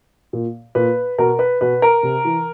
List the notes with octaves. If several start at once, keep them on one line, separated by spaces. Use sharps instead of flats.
A#2
A#2 B4
B2 A#4
B4
B2 B4
A#4
C3
E3